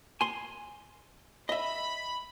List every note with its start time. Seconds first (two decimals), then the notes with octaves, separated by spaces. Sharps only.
0.21 G#5 C6
1.49 D#5 E5 B5